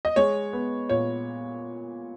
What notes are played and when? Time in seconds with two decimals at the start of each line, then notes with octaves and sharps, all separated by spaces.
0.05 D#5
0.16 G#3 C#5
0.53 B3
0.89 A#2 C#5